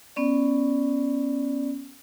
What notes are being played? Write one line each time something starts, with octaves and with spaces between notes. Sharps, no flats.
B3 C#4 D5